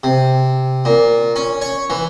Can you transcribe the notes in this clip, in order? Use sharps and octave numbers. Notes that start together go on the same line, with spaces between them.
C3
A#2
C#4
C#5
E3